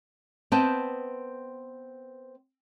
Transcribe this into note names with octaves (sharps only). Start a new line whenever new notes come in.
B3 C4 B4 D#5 G5 A5